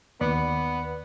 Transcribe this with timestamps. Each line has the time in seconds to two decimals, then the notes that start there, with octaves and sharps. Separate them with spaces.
0.21 D#2 B3 D5 B5